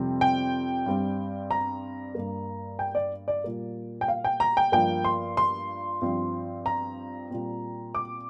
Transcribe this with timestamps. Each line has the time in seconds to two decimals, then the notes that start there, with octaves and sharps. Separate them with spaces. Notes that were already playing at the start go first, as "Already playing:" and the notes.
Already playing: F2 C3 G3 C4
0.21 G5
0.86 G2 G3 C4
1.51 A#5
2.15 G2 G3 A#3
2.79 G5
2.95 D5
3.28 D5
3.44 A#2 G3 A#3
4.01 G5
4.08 F5
4.24 G5
4.40 A#5
4.57 G5
4.72 G2 F3 A#3 G5
5.04 C6
5.37 C6
6.02 G2 F3 C4
6.66 A#5
7.31 A#2 G3 C4
7.95 D6